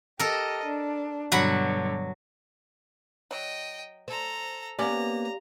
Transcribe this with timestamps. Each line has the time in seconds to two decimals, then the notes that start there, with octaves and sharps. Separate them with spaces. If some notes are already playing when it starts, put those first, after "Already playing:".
0.19 G4 A4 A#4 D#5
0.64 D4
1.32 G2 B2 D3 F#3 F#5 B5
3.31 F#3 D#5 G5
4.08 A4 C5 A#5
4.79 A#3 B3 C#4 G4 D5 F5 A#5